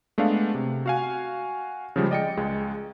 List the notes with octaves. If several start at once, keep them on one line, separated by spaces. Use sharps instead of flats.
G#3 A3 B3 D4 F5
C3
F#4 F5 G#5
C#3 F3 G3 G#3
D5 D#5 G5 A6 C#7
C#2 G#3